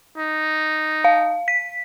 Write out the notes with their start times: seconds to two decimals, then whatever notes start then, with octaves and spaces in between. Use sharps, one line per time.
0.17 D#4
1.05 F5
1.48 B6